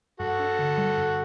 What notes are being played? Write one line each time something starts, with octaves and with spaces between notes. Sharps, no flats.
G2 F#4 A4
D4
D3
G3
G2